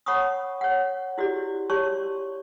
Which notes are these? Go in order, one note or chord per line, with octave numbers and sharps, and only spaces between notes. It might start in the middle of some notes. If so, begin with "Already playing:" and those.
C#5 F#5 A5 B5 C#6 D#6
C#5 F#5
E4 F#4 G4 D5
G4 C#5 D5 A5 C6 C#6